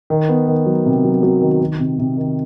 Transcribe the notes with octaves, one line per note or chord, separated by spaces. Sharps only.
D#3
B3
D#3
F#3
C3
F#3
F#3
D#3
D#3
C3
C3
D#3